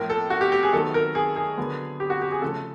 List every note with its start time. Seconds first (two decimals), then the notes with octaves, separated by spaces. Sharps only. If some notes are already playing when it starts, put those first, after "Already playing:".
Already playing: A2 F3 A#3 A#4
0.10 A4
0.30 F#4
0.41 G4
0.52 G4
0.63 G#4
0.72 D#3 F#3 B3 A4
0.94 A#4
1.15 G#4
1.36 G#4
1.57 D3 F#3 B3
2.00 G4
2.10 F#4
2.21 G4
2.32 G#4
2.42 C#3 F3 A3 A4